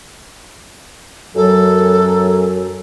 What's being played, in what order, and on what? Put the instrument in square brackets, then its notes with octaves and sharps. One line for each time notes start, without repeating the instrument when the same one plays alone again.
[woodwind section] F#2 F#3 [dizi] A4